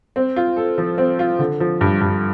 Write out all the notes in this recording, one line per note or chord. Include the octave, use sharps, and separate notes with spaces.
C4
F4
A4
F3
C4
F4
D3
F3
G2
G2